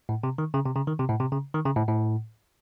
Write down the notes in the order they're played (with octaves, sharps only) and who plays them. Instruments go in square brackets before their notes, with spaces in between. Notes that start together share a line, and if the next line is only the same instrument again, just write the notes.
[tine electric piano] A2
C3
D#3
C#3
C3
C#3
D#3
C3
A2
C3
C#3
D#3
C#3
A2
A2